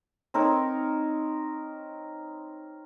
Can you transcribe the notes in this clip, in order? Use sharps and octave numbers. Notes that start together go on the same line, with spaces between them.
C4 D#4 A#4 C#5